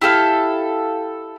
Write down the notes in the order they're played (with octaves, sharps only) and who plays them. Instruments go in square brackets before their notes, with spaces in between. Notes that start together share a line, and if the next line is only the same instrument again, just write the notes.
[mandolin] E4 G4 A4 F5